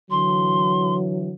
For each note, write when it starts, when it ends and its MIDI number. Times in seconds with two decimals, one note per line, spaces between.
0.11 1.34 50
0.11 1.34 52
0.11 1.34 54
0.11 0.94 84